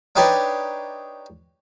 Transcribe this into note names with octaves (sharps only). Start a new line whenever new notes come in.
D4 D#4 G4 B4 C#5 D5